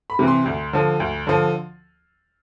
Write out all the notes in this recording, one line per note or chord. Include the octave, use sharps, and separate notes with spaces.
B5
C3 E3
C6
D2
D3 F3
D2
D3 F3